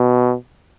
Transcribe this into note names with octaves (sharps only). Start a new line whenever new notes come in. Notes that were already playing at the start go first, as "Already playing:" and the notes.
Already playing: B2